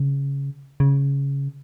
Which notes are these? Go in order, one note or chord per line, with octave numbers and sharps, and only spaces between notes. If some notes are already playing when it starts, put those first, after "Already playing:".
Already playing: C#3
C#3